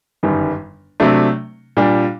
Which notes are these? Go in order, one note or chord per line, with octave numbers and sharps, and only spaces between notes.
G1 F#2 D#3 G3
C3 F#3 A3 D4
A#2 G3 D4